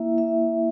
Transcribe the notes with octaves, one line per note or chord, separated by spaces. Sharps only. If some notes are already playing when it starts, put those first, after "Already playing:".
Already playing: A#3 E4 E5
E5